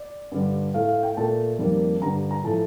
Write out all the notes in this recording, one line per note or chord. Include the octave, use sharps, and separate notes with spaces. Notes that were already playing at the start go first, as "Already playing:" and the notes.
Already playing: D5
G2 D3 G3
A2 A3 F5
F5
G5
A#2 A3 A5
F2 D#3 G3 A#3
G2 D3 G3 A#5
A#5
A2 F3 A3 A5